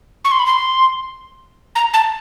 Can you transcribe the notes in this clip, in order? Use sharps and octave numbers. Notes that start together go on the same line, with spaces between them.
C#6
C6
B5
C6
A#5
A5